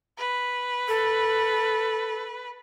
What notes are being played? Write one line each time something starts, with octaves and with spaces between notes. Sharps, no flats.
B4
A4